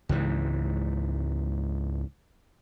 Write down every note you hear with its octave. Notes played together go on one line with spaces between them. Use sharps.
C#2 G#2 E3